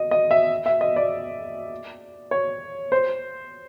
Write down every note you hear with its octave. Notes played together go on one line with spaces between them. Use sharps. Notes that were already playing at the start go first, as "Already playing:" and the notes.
Already playing: D#5
D#5
E5
E5
D#5
D5
C#5
C5